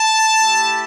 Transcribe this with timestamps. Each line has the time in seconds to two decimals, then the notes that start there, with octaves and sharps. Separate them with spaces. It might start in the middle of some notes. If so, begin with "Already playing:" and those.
Already playing: A5
0.38 A3 E4 G4